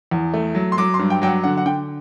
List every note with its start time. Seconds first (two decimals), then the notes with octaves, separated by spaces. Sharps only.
0.11 E2
0.34 A3
0.55 F#3
0.72 C6
0.78 F#3 D6
0.94 C6
0.99 G2
1.10 G5
1.22 F#3 G5
1.27 F#5
1.44 D3 F#5
1.58 F#5
1.66 D3 G5